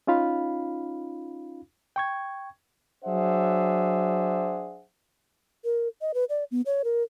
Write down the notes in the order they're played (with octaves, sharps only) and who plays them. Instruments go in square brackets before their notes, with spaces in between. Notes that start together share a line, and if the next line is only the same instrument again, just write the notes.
[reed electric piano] C#4 D#4 F4 F5 B5
G5 C#6 G#6
[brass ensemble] F#3 D4 G#4 C5 E5 F#5
[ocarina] A#4
D#5
B4
D5
B3
C#5
A#4